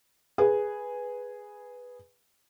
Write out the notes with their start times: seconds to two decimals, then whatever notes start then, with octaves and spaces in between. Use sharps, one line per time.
0.38 G#4 B4